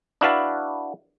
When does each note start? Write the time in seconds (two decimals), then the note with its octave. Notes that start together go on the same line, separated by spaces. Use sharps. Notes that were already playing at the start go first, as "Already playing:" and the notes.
0.21 D4 E4 F#4 B4 F5 A5